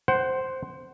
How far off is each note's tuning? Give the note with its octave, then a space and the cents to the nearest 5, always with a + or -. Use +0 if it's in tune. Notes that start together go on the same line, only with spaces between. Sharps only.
C5 +0 F#5 +30